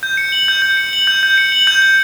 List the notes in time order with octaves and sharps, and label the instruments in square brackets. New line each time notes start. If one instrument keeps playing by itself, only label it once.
[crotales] G6
C#7
F#7
G6
G6
C#7
F#7
G6
G6
C#7
F#7
G6
G6